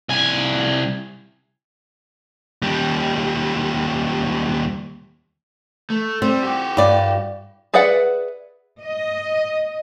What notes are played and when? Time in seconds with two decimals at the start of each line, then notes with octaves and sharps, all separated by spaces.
0.09 C2 G#5
2.62 D#2 G3
5.90 A3
6.22 G3 C4
6.43 F#4 G4
6.77 G2 D5
7.74 G#4 B4 D5 E5 F#5
8.80 D#5